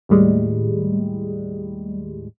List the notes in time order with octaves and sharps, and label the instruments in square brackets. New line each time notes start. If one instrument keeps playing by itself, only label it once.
[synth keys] D#2 A2 G3 G#3